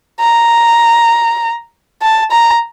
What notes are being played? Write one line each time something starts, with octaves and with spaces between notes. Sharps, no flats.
A#5
A5
A#5